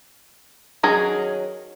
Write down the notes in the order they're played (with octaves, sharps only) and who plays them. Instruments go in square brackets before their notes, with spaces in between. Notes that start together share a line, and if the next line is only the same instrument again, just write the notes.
[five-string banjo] D#3 F#3 C#4 G#4 A#5